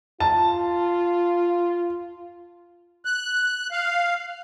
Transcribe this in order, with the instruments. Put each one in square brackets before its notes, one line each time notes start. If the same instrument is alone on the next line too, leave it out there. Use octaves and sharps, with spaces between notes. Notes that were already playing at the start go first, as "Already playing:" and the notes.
[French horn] F4 [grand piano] A5
[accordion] F#6
F5